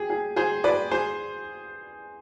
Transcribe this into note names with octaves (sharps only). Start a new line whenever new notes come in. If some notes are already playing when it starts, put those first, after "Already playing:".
Already playing: G4 G#4
G#4
G#4 C5
B4 D5
G#4 C5